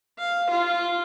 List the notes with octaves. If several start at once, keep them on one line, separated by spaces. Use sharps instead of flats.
F5
F4